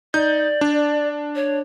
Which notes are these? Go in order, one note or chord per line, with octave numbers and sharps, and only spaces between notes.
D#4 D5 G6
D4
C#5